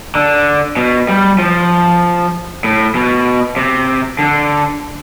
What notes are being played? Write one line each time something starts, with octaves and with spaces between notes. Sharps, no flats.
D3
B2
G3
F3
A2
B2
C3
D3